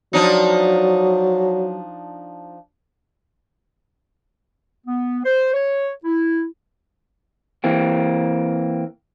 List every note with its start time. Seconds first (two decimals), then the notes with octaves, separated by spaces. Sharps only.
0.13 F3 F#3 D4 D#4
4.86 B3
5.25 C5
5.54 C#5
6.05 E4
7.64 E3 A#3 C4